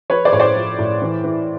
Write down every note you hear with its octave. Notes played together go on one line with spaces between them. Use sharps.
F3 B4 C#5
C5 D5
A2 C#5
C5 D5
F3
A2
E3
E3